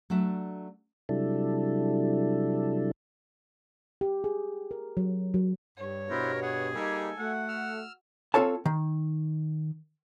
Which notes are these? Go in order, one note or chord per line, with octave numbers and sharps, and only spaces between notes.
F#3 A3 D4 E5
C3 F#3 G3 D4 E4 A4
G4
G#4
A#4
F#3
F#3
G2 C#5
G2 B2 B3 E4 A#4 C5
G#4 F#5
G3 A#3 D#4 G4 A4 G#5
A3 F#4 F#5
E6 F6
C4 F4 A4 C#5 A5
D#3